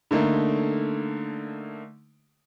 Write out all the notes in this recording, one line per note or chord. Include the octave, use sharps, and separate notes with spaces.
D3 A3 A#3 D#4